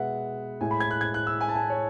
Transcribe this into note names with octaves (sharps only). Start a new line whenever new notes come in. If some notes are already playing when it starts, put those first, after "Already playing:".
Already playing: B2 G#3 B4 E5 F#5
A2 G#3 G#5
B5
G#6
F#6
G#6
F#6
E6
G#5
A5
G#5
C#5